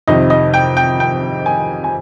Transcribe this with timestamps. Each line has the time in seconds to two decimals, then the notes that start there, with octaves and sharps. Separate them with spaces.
0.08 F2 C3 D#3 D#5
0.30 D#5
0.54 G5
0.77 G5
1.00 G5
1.46 G#5
1.84 G#5